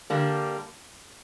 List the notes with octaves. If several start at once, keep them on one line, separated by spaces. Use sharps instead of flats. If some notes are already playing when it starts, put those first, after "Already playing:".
D3 G3 A#3 D4